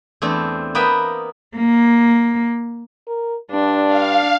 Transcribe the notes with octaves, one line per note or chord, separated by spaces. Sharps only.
E2 A3 C4 D4
A#3 B3 B4 D#5 E5 G5
A#3
A#4
G2 D4
F5